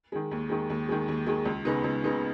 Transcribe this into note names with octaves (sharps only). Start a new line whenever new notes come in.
D#3 G#3
D#2
D#3 G#3
D#2
D#3 G#3
D#2
D#3 G#3
C#2
C#3 B3 D#4
C#2
C#3 B3 D#4